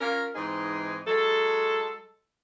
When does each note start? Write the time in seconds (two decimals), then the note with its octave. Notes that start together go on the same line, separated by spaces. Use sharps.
0.01 C#4 F4 A#4
0.35 G#2 E3 C4 D#4 G#4
1.07 F#3 G#3 A4